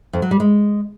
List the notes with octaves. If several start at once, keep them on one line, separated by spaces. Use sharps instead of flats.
F2
F#3
G3
G#3